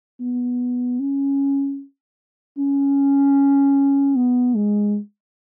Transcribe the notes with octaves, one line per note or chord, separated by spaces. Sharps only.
B3
C#4
C#4
B3
G#3